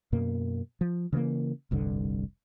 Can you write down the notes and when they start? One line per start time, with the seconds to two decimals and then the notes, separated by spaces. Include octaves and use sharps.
0.12 F#2 B2 A#3
0.81 F3
1.13 C#3 E3 G3 A#3
1.71 F1 C2 G2 D3